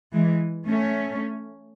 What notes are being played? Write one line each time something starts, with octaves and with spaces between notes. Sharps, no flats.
E3 G#3
A3 C#4